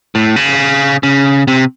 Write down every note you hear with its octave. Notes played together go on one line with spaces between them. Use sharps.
A2
C#3
C#3
C3